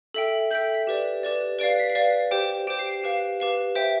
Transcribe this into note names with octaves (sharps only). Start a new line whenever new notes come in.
A4 E5 G5
A4 E5 G5 G6
B6
G4 B4 D5
G4 B4 D5
B4 D5 F5 D7
C7
B6
C7
B4 D5 F5
G4 C5 G5
G4 C5 G5 D7
C7
D7
C7
G4 B4 F5
G4 B4 F5
C5 E5 G5